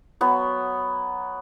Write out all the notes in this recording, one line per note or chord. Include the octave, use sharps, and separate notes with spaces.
F#3 B3 C#5